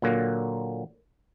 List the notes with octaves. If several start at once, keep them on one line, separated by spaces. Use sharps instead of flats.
A#2 D3 F#3 A#3